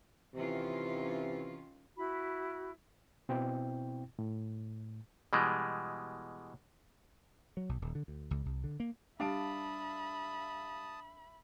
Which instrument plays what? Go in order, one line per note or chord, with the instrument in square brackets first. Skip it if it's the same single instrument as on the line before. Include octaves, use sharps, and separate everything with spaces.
[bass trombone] C3 [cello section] D#3 C#4 F4 [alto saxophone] E3
[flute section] E4 F#4 B5
[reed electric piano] B2 C4 E4 G5
A2
[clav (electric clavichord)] B2 E3 G3 G#3
[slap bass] F#3
B1
D#1
D3
D2
C#2
C2
D3
A#3
[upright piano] G3 F5 D7 [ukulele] D4 [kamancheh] E5 B5 [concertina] A5 D#6